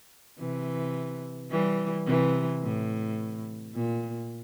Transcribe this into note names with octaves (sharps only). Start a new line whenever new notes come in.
C3 E3
E3 G3
C3 E3
A2
A#2